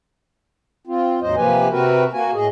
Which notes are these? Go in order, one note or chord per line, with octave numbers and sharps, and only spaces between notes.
C4 F4
D#2 G#2 F#3 C5 D#5
C3 F3 A#3 G4 B4 G#5
C3 C4 F#4 A#4 B4
A#3 F#4 G#5
A2 G#4 D#5